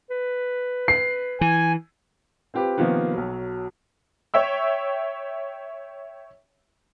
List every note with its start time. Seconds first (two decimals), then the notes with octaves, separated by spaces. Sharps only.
0.10 B4
0.88 C7
1.41 E3 G#5
2.54 C4 F4 G4 B4
2.78 C3 D#3 F3 A#3 B3
3.13 B1 F#3
4.34 C#5 E5 G5 E6